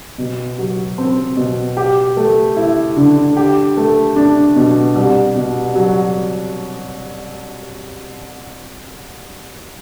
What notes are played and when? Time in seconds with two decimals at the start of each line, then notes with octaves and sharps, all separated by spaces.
0.18 B2
0.58 F#3
0.98 C4
1.37 B2
1.77 G4
2.17 A3
2.57 E4
2.96 D3
3.37 G4
3.77 A3
4.16 D4
4.56 B2
4.96 C2
5.35 B2
5.75 F#3